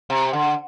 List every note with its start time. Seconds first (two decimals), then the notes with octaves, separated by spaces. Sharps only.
0.10 C3
0.33 D3